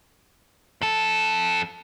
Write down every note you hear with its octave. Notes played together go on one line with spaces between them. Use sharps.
F2 A4